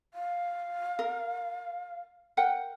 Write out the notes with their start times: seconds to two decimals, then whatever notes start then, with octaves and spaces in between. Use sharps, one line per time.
0.14 F5
0.99 A#4
2.37 A#4 F#5 G5